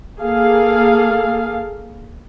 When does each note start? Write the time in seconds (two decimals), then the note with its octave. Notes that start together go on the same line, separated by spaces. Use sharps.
0.20 A#3 G#4 A4 F5